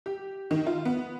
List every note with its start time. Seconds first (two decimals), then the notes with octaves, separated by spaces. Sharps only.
0.06 G4
0.51 D#3
0.67 F4
0.85 B3